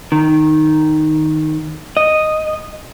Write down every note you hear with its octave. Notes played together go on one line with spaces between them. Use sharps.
D#3
D#5